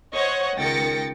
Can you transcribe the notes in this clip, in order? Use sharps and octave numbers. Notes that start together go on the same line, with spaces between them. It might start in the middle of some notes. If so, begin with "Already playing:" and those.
C5 C#5 D#5 F#5 C#6
C#2 D#3 G5 A6 A#6 C#7